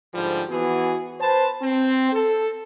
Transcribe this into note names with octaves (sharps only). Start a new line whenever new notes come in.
G#2 D3 F3 G3
E3 B3 F#4 G#4
B4 C5 A5
C4
A4